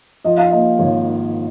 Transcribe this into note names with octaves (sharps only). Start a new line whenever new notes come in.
F3 D#5
F5
A#3 D#5
G#1 C#5